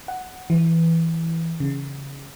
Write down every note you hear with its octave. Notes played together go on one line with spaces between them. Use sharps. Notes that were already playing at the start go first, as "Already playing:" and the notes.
F#5
E3
C#3